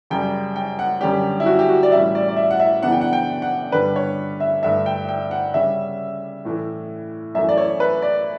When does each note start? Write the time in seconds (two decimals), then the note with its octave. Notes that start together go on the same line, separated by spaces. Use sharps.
0.10 F#2 C#3 G3 G5
0.56 G5
0.79 F#5
1.01 F#2 D3 G3 C#4 G4
1.40 E4
1.46 F#4
1.59 G4
1.69 F#4
1.83 D5
1.92 A2 E3 G3 C#4 E5
2.15 D5
2.29 D5
2.37 E5
2.51 F#5
2.60 E5
2.83 F#2 C#3 E3 B3 D4 F#5
2.92 G5
3.01 F#5
3.13 G5
3.42 F#5
3.72 G2 D3 G3 D4 B4
3.96 C#5
4.40 E5
4.63 G2 D3 A3 E5
4.86 G5
5.08 G5
5.31 F#5
5.54 C#3 G3 C#4 E5
6.45 A2 E3 A3
7.35 F#2 E3 A3 E5
7.49 D5
7.57 C#5
7.80 B4
8.02 D5